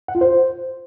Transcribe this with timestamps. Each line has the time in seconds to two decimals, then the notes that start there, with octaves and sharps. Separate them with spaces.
0.08 F#5
0.15 F4
0.21 C5